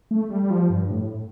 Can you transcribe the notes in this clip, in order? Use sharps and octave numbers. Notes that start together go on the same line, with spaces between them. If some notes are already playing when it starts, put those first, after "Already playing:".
A3
G3
G3
F3
G2
A2